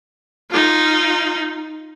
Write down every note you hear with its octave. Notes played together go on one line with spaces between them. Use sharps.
D#4 F4